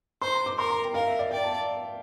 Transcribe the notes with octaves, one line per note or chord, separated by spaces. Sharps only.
C5 C6
A#5
D6
A#4 C6
A#5
G5
A#4 F5
E5
D5
D5 G5
A5